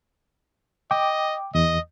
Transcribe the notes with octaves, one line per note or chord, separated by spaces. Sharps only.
D#5 G5 D6
E2 D#5